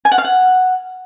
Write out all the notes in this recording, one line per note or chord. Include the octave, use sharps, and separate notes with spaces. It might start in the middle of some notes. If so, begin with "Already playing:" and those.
G#5
F#5
F5
F#5